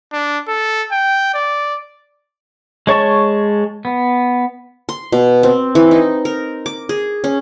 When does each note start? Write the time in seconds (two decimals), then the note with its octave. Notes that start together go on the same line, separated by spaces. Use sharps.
0.13 D4
0.48 A4
0.92 G5
1.34 D5
2.87 G#3 C#5 A5 C#6
3.85 B3
4.89 C6
5.12 B2
5.43 C4
5.75 E3
5.91 D#4
6.25 A#4
6.66 D6
6.89 G#4
7.24 C#4